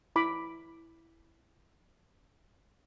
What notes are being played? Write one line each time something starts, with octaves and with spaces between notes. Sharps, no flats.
E4 B5 D6